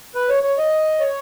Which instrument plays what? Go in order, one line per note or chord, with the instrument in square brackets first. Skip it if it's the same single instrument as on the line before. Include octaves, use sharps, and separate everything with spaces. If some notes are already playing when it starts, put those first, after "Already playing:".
[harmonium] B4
C#5
C#5
D#5
C#5